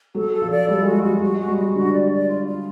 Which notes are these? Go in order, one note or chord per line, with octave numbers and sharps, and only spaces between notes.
F#3 A4
A4
F3
D5
G3 A4
G#3
F#4
G3
F#3 F#4
G3 F#4
G#3
F#4
G3
F#3 F#4
D3 F#4
D5
D5
F4
F4